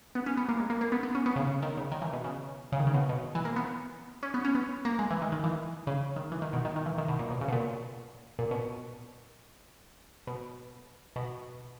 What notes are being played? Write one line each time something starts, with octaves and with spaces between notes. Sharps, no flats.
B3
C#4
B3
A#3
G#3
A#3
A#3
B3
B3
C#4
B3
C#3
C#3
D#3
C#3
D#3
E3
B2
C#3
C#3
D#3
C#3
B2
B2
E3
A#3
B3
C#4
B3
C#4
B3
A#3
G#3
E3
D#3
D#3
E3
C#3
D#3
E3
D#3
B2
D#3
D#3
E3
D#3
B2
A#2
B2
C#3
B2
A#2
A#2
B2
B2
B2